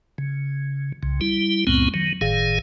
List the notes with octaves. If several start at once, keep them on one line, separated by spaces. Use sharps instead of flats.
C#3
C2 C#3
G3 E4
C#2 F#2 A#2 G#3 B3 C4
D#3 F#3
G1 A2 D#3 G#4 F5